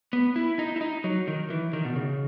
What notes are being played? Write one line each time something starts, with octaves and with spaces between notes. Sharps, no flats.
B3
E4
D#4
E4
D#4
F#3
D#3
E3
D#3
B2
C#3